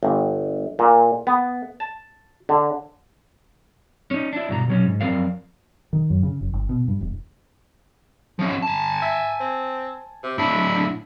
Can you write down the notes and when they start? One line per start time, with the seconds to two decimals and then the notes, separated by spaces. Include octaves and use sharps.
0.03 G1
0.79 A#2
1.27 B3
1.80 A5
2.49 D3
4.11 C#4 D#4
4.33 D4 E4
4.49 G2 B2 A#5
4.68 B2 F#3 C#4
4.85 G#2
5.01 F#2 F3 C4 A#4 D5 F5
5.93 D#3
6.10 F#2
6.23 C#3
6.41 F#1
6.53 G1
6.69 B2
6.88 G2
7.01 E1
8.39 F3 C#4
8.62 G#5 A5
9.02 E5
9.40 C4
10.23 C3
10.38 A2 D4 E4